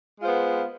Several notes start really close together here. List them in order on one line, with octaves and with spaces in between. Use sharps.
G#3 F4 C5 B3